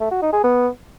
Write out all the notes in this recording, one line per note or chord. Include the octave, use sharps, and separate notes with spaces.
A3
F#4
D#4
G#4
B3